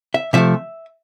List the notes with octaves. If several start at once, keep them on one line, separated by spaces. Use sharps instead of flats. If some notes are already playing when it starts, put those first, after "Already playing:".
E5
C3 F3 A3 E5